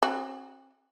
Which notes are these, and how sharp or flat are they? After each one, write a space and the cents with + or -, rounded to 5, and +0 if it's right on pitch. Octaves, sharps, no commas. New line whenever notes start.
C4 +40 F#4 +0